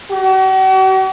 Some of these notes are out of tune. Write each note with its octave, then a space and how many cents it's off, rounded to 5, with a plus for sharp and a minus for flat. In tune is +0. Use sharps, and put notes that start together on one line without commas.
F#4 +45